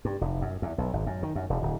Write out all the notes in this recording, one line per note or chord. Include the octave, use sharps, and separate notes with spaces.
G2
F1
F#2
E2
B1
G#1
F#2
D#3
F#2
E1
D1